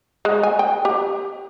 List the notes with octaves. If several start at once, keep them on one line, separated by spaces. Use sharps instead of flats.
G#3
G#5
G5
G4